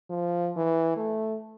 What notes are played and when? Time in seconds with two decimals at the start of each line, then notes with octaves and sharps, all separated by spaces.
0.10 F3
0.57 E3
0.97 A3